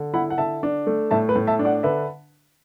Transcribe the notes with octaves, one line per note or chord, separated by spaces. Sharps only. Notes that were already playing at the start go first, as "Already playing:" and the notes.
Already playing: D3
E4 F#5 B5
F#5
D3 E5 A5
D4
A3
A2 E5 A5
B4
A2
E5 A5
D4
D5 F#5
D3 B4 E5